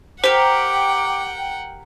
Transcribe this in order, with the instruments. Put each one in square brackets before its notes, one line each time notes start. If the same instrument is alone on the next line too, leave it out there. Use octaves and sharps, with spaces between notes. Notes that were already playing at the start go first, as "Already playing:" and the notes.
[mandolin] G4 A#4 [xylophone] C5 [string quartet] F#5 G5 [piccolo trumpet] D6